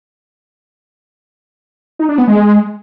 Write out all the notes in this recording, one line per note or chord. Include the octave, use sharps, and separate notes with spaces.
D#4
D4
B3
G#3